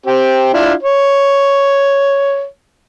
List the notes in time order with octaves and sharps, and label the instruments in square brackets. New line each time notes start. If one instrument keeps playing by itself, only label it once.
[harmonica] C4 G4
D4 E4 F4
C#5